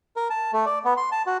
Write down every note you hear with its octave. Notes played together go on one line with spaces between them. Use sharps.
A#4
A5
A3
D5
B3
C6
A5
F#4